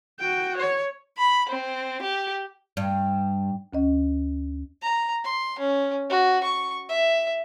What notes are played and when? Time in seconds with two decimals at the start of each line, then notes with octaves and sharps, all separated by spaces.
0.19 F#4 G5
0.57 C#5
1.18 B5
1.49 C4
2.02 G4
2.77 G2
3.73 D2 C#4 D#5
4.82 A#5
5.24 C6
5.59 C#4
6.10 F#4
6.43 C#6
6.89 E5